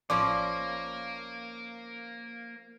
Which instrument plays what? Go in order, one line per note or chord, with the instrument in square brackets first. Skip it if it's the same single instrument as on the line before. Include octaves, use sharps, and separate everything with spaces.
[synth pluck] A1 D5 [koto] F3 C#4 [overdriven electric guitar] A#3 [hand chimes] D6